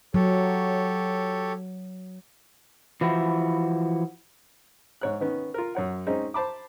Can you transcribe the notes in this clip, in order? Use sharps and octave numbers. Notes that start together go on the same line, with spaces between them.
F#3 G4 A4 C#5
E3 F3 E4 F#4
G#2 C#5 F#6
D#3 B3 C#4
F4 A#4
F#2 C#5 F#5
G#3 C4 C#4 D#4 G#4
C5 A5 B5 D6